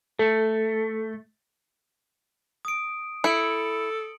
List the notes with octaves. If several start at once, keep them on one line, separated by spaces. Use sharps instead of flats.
A3 A4
D#6 D7
E4 A4 C#7 D7 F#7